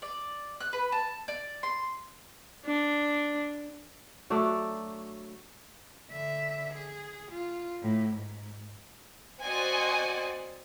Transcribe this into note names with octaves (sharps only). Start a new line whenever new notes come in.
D5
F#6
B4
A5
D5
C6
D4
F#3 A3 D4 D5
D3 E5
G#4
F4
A2
G#2
C4 F#4 C5 D5 D#5 G#5